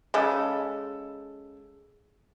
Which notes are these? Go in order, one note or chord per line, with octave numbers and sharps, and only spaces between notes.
C#3 G#3 A4